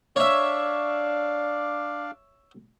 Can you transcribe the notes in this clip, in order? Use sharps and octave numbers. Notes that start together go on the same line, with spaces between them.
D4 C#5 D5 E5 F5